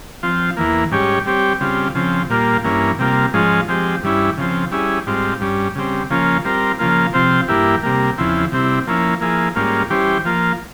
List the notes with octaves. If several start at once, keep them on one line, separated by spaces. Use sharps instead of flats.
F3 C4 F4
E2 E3 A#3
G#2 G3 C#4 G4 C#5
G3 C4 G4 C#5
C#3 G3 C4 F4
C#3 F3 C4
A#2 G3 A#3 F4
G2 E3 A#3 C#4
C3 G3 A#3 F4
G#2 F3 G#3 C#4 F4
F3 G#3 C4 G4
G2 E3 G3 C#4 E4
C#3 F3 C4
G3 C#4 E4 G#4
G#2 G3 C4 F4
G2 G3 C#4
C#3 G3 C4
C#3 F3 A#3 C#4 F4
G3 C4 F4 A#4
C#3 F3 A#3 F4
C3 F3 C4 F4 C5
G2 E3 A#3 E4 G4
C3 G3 A#3
E2 C#3 F3 C4 E4
C3 G3 C4 E4
F3 A#3 C#4 E4
F3 A#3 E4 G#4
G#2 G3 A#3 C#4 F4
E3 G3 C#4 G4 C5
F3 A#3 F4